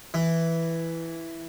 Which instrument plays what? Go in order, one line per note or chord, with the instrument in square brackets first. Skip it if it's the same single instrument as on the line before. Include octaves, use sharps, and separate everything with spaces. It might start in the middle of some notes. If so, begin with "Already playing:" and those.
[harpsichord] E3